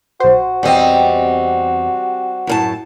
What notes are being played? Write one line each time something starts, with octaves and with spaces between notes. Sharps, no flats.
B1 F#4 C5
E2 G3 C4 D#5
F#2 A2 A5